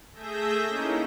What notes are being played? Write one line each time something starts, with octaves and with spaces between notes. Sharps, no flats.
A3 G#4 E5 G6 A#6
A#3 C#4 D#4 E4